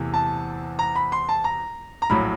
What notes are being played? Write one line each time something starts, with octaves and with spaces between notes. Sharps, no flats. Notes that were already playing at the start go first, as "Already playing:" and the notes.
Already playing: E2 C3 E3 A3
A5
A#5
B5
C6
A5
A#5
A#5
A#1 A2 F#3 B5